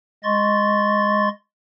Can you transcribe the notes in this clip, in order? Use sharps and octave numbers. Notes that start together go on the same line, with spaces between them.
G#3 D#5 C6 C#6 A6